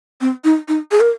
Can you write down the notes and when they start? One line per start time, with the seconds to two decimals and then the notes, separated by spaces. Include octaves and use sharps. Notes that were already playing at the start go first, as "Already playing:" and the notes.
0.21 C4
0.44 D#4
0.68 D#4
0.91 G#4
1.00 A#4